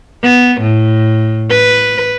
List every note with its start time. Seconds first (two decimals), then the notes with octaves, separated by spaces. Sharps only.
0.23 B3
0.61 A2
1.50 B4